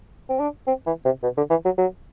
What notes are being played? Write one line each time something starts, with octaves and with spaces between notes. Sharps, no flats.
C4
D4
C4
E3
C3
B2
D3
E3
F#3
F#3